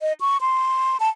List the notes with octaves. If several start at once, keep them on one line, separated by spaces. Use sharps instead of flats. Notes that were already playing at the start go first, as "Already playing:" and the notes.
D#5
C#6
C6
A5